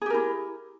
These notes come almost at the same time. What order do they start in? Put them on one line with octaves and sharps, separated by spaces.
G#4 G4 A#4 E4